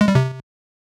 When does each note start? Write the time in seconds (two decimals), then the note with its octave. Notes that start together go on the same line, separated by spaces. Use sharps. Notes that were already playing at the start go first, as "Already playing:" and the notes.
0.01 G#3
0.08 G3
0.15 C3